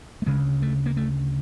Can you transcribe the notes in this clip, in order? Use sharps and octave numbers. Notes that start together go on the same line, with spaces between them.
A3
D2 C#3 G#3
A3
A#3
A3